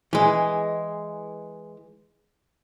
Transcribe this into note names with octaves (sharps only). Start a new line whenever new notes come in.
E3 G#3